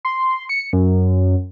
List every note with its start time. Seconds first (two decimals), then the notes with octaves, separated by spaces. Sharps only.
0.05 C6
0.49 C#7
0.73 F#2